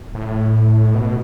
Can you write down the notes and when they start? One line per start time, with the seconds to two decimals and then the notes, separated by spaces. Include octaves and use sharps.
0.15 A2
0.94 B2